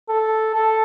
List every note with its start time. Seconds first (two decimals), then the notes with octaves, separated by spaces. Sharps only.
0.09 A4
0.55 A4